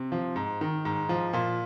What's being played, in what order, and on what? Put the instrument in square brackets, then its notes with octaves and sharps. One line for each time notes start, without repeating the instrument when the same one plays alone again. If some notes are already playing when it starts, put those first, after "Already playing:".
Already playing: [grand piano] C3
F3
G#2
D#3
G#2
F3
A#2